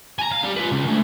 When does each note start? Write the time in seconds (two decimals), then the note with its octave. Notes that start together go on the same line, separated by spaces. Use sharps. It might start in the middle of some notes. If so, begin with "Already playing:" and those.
0.19 G#5 A#5
0.32 F5
0.44 G3
0.56 F4 B4
0.72 C#2
0.87 D2